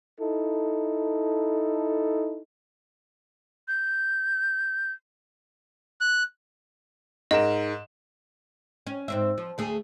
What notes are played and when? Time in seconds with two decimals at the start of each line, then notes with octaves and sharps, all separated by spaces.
0.20 D#4 E4 A4
3.68 G6
6.01 F#6
7.31 G#2 A#4 D#5 E7
8.87 C#4
9.08 G#2 C4 E5
9.38 F3
9.58 D2 A3 G#4